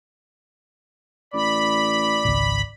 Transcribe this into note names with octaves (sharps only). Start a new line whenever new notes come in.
A1 D5 B5
G#1 C#2